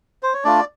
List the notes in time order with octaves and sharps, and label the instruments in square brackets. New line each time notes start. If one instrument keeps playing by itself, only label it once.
[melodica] C5
C#5
A3 D4 F4 D5